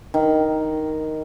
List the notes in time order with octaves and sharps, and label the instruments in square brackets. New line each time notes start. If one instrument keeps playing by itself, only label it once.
[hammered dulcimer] D#3